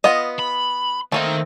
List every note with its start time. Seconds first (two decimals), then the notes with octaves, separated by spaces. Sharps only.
0.04 B3 F4 D#5
0.39 B5
1.12 D#3 A3 A#3 C4 D#4